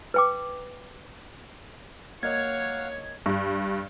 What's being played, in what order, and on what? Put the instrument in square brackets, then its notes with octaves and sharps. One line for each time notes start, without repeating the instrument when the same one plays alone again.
[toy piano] B4 G5 D6
[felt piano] A#3 D#5 [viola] C#5 [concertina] F5 F#5 [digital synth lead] G#6
[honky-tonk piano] G2